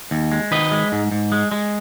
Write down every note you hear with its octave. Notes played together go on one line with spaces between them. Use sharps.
D#2
G#3
D#3 B4 D#5
G#3
G#2
G#2
G#3
G#3